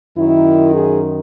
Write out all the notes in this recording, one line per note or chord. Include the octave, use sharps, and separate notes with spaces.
F#2 D#3 E4
G#4